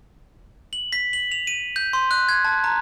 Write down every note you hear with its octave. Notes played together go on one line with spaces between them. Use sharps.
F#7
B6
F#7
F7
D#7
G6
C6
F#6
G#6
A5
A#5